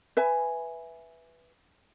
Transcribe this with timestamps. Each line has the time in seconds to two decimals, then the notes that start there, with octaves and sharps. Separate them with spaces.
0.17 B4 E5 G#5